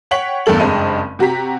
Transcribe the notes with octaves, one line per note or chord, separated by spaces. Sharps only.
C#5 F#5 G5 C#6 B6 F#7
E2 G2 A3 A4 F#7
F#1 G2 G#3 C4 D#5 D#7
C3 F#4 G4 A#5 B6